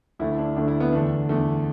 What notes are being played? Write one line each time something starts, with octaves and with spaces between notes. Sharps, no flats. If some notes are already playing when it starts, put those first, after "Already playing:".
D2 D3 A3 E4
D4
D2 D3 A3 D4
E4
B3
E2 D3 A3 D4
E2 D3 A3